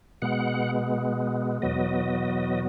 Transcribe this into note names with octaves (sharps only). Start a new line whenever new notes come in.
B2 G#3 B3 F#5
E2 B2 F#3 B3 D#5